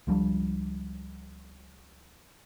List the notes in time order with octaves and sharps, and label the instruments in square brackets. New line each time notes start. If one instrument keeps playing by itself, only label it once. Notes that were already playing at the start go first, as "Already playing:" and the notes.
[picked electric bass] C#2 F3 G3 D4